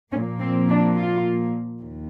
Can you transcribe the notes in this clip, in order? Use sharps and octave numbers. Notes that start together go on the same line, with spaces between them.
A#2 F3 A#3 C#4
C4
D4
F4
D#2